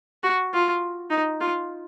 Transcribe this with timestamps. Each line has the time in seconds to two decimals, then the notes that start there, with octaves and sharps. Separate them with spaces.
0.23 F#4
0.53 F4
1.10 D#4
1.41 F4